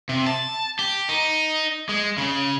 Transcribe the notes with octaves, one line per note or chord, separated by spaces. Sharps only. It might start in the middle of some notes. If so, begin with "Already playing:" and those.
C3
A5
G4
D#4
G#3
C#3